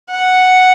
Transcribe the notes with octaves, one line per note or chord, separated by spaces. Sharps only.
F#5